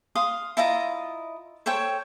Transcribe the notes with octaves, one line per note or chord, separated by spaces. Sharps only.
F5 C6 D#6
E4 F4 D#5 A#5
A4 C5 C#5 G5